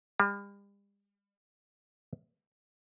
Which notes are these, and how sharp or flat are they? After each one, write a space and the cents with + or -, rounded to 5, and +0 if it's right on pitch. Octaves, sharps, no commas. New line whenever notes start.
G3 +40